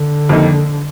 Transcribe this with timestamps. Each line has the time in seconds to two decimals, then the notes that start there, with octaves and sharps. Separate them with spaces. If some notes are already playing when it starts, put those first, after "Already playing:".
Already playing: D3
0.29 F2 D#3 A#3 D#4 A4